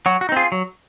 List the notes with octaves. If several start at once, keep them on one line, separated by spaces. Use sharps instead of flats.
F#3 F#4
F#4
D#4
C4 F4 G#4
F#3